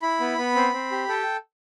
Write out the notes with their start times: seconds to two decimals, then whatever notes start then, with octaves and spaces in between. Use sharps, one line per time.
0.02 E4 B5
0.20 B3
0.38 B3
0.55 C4
0.73 C4
0.91 G4
1.09 A4 G5